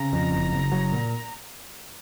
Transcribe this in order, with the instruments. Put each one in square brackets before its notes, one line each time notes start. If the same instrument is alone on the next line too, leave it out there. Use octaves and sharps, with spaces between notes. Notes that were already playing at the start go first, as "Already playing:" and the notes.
Already playing: [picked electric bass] C#3 [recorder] A#5
[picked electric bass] F2
F#1
F#1
F#3
A#2